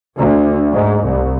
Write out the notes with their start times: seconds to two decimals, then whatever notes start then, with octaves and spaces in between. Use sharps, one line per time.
0.18 D2
0.72 G#2
1.06 C2